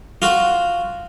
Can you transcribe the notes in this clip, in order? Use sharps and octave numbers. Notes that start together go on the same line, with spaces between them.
F4 F#4